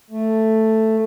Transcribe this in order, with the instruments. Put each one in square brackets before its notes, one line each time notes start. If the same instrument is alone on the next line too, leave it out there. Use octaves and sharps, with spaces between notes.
[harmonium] A3